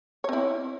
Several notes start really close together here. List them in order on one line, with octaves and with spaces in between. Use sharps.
C#5 C4 E4